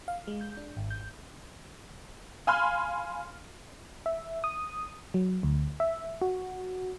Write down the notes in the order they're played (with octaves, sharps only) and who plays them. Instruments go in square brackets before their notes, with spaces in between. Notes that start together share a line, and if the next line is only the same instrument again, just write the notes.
[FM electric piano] F5
G#3
G6
D4
G#1
G6
[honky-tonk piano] F5 G#5 B5 C6 F6
[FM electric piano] E5
D#6
F#3
D2
E5
F#4